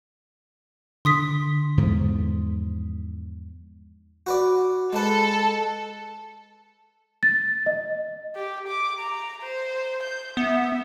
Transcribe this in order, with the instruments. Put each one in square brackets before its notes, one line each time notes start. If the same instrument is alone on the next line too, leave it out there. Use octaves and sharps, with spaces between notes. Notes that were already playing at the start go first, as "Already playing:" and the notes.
[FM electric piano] D3 [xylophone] C6 D#6 B6
[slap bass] E2 G#2 D3 F3
[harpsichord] F#4 B4 D5
[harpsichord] G#3 B4 [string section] A4
[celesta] A6
D#5
[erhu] G4
D6
A#5
C5
G6
[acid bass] B3 [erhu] E5